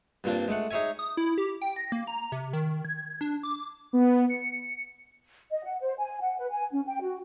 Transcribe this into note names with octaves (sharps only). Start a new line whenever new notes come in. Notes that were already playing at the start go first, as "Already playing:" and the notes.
G2 A#2 C4 D4
G#3 A3 F#5
D#4 G#4 C#5 E5 G#5
D#6
E4
G4
G5
A#6
A#3
A#5
C3
D#3
G#6
D4
D6
B3
C#7
D#5
F#5
C5
G#5
F#5
B4
G#5
C#4
G5
F#4